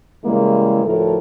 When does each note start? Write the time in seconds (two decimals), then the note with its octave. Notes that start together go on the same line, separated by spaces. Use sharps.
0.25 C#3 E3 G3 G#3 A#3 E4
0.84 D2 A2 F3 E4 A4 A#4